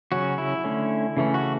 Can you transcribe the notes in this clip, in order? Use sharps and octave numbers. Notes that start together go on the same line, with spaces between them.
C#3 F#3 C#4 F#4
E4
D3 A3 C#4
C#3 E3 A3 C#4
F#4